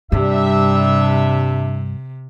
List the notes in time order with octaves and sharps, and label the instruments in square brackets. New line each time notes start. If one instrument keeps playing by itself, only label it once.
[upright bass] G2 [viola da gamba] C3 [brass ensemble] G3 D4 E5